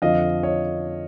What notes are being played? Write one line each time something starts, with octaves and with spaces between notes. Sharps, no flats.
F2 D3 F3 D#5 F5
C#5 D#5